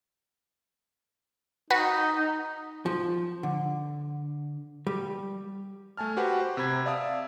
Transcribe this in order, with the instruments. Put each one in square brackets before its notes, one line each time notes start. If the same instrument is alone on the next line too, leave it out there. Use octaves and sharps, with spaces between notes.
[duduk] D#4 [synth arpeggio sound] F#4 B4 E7
[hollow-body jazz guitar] F3
D3
G3
[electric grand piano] A3 G#5 A5 F6
F#4 G4 B4 C5 F#5
C5
C3 C4 B5 G#6 B6
D5 E5 F5 A5 D#6 E6